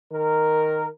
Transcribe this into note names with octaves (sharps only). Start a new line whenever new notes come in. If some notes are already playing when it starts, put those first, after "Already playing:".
D#3 A#4